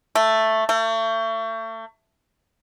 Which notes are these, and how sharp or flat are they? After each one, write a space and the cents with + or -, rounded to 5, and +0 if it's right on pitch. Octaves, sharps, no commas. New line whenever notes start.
A3 +5
A3 +35